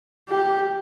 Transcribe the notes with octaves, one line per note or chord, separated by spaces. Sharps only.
G4